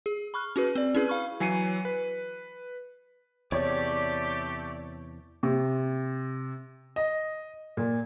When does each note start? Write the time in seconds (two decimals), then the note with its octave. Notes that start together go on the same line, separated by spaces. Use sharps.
0.06 G#4
0.34 B5 C#6 F6 F#6
0.56 C#4 F#4 G#4 B4
0.75 C4 D5
0.95 C#4 E4 G#4 B4
1.08 F5 B5 C#6 F6
1.40 E3 F#3 G#5 C7 C#7 D#7
1.85 B4
3.52 E2 C3 A3 G4 C#5 D5
5.43 C3
6.96 D#5
7.77 A#2